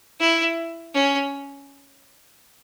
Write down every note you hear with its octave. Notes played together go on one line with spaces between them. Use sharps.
E4
C#4